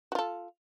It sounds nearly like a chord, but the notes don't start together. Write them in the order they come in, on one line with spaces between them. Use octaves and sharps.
F#4 F4 A4